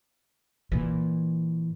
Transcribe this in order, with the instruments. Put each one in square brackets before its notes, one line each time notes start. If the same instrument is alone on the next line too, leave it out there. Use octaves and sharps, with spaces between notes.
[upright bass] A#2 E3